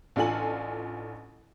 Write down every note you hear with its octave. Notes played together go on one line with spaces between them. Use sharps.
A1 D4 F4 A4 G#5 F#7